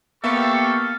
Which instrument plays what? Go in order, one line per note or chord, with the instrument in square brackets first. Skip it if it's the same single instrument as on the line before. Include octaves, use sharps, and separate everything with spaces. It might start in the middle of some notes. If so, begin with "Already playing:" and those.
[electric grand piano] A#3 B3 E5 [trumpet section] G4 C#6 [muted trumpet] A4 [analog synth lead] F5